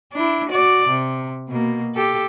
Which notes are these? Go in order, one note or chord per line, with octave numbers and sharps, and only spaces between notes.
D4 E4
F#4 D5
C3
B2 A#3
G4 A4